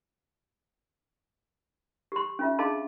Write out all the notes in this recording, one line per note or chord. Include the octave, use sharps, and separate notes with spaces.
G4 C6
C#4 F4 E5
D4 G#4 D#5 F5 A5 C6